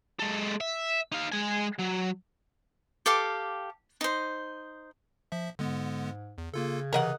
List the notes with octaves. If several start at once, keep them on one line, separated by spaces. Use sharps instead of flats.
G#3 A4
E5
D#4 F5
G#3 G#5
F#3
G4 A4 F5 D6
D#4 C5
F3 E5
G#2 D3 G#3 B3
E2
C#3 A#3 F4 A4
C3 E3 A#4 D#5 F#5